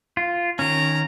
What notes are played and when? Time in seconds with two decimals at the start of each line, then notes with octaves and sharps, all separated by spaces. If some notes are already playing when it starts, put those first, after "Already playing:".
0.17 F4
0.59 D#3 C#4 A#5